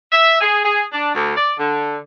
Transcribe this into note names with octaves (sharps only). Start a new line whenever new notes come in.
E5
G#4
G#4
D4
D2
D5
D3